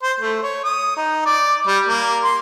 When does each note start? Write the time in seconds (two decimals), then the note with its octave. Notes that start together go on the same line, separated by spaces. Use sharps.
0.03 C5
0.20 A3
0.43 C#5
0.64 D#6
0.97 D#4
1.26 D5
1.67 G3
1.86 A#3
2.24 C6